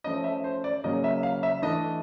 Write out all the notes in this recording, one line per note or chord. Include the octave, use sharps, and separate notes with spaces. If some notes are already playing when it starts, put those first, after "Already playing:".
F3 A3 C#4 D#5
E5
C5
D5
C#3 F#3 A#3 C#4 D#5
E5
F5
E5
E3 A3 D4 D#5